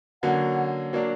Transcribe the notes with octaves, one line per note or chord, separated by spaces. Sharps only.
D3 F#3 A#3 C#4 F#5
F#3 A#3 D4